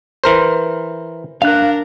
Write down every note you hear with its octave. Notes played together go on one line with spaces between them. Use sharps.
E3 A#4 C5
D4 A#4 F5 F#6